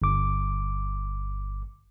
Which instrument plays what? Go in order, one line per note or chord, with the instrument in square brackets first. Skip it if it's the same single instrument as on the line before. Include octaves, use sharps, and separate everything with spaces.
[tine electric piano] G1 D6